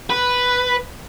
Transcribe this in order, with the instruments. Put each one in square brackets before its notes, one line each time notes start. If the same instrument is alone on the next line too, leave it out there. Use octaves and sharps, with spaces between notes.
[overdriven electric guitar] B4